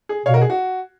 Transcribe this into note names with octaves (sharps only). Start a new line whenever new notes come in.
G#4
B2 C#5 F5
F#4 A#4
G#4
F#4